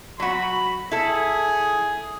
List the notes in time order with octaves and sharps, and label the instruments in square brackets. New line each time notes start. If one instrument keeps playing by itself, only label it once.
[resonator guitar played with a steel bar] F#3 F#4 [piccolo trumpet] B5
[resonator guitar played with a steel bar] E4 A4 [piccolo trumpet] G#4